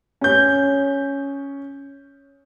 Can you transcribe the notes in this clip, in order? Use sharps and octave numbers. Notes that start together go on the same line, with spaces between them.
C#4 G6